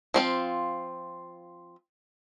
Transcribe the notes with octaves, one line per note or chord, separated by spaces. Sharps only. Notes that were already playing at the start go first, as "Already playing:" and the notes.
F3 C4 F4